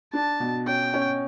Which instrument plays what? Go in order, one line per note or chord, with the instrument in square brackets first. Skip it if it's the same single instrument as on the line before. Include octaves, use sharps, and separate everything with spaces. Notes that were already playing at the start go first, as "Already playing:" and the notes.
[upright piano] D4 [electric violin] A5
[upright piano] B2
[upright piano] C#4 [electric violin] G5
[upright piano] C#4